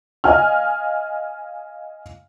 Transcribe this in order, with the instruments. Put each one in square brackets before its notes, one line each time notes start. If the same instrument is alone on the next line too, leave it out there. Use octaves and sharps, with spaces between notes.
[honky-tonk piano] D#5 F5 G#5 F6